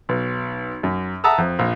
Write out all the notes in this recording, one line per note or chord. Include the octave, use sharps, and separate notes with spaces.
B1
F#2
E5 F#5 A5 A#5 D#6 E6
F2
A#1